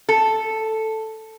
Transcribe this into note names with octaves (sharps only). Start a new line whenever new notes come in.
A4